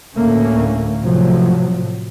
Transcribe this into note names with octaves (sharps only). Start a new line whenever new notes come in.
D2 A2 D3 A3 A#3 C#4
A2 C3 F3 F#3